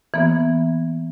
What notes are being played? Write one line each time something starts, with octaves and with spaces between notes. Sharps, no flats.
E3 A#3 B3